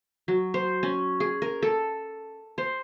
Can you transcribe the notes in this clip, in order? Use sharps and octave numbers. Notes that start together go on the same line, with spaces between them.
F#3
C5
C#4
G#4
A#4
A4
C5